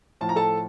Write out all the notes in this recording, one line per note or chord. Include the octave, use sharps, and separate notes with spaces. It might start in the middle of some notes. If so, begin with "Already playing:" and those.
A2 F3 A5
A#5
A4 A5